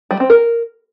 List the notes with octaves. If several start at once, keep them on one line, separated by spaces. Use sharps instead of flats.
G3
C4
A#4